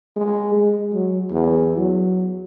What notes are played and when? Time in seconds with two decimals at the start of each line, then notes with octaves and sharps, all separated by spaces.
0.17 G#3
0.54 G#3
0.94 F#3
1.31 E2
1.78 F#3